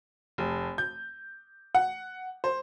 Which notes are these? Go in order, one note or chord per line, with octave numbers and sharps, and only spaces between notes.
F1
G6
F#5
C5